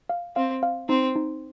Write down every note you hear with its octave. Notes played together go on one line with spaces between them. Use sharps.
F5
C4 F5
F5
C4 D#4
D#4